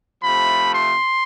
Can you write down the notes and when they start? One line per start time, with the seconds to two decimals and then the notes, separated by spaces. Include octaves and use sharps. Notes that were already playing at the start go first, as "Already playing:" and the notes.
0.22 C3 F3 A3 B5
0.73 C6